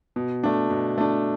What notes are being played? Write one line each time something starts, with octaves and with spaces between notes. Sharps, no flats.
B2
A3 D4
B2
A3 D4